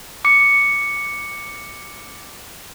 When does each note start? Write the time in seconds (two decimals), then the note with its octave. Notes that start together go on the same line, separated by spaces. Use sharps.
0.25 D6 C#7